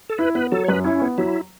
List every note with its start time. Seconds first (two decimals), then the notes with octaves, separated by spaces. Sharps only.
0.10 A4
0.18 E4 B4
0.35 B3 B4
0.52 F#3 A4
0.64 C#5
0.68 F#2 B4
0.84 C#4 E4
1.02 B3
1.18 F#3 E4